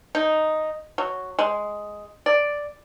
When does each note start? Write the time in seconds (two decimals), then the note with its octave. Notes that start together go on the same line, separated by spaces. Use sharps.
0.15 D#4
0.98 F#3
1.39 G#3
2.26 D5